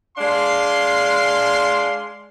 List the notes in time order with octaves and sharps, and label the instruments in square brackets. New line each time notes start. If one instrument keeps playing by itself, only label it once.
[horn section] G#3 D4 F5 C6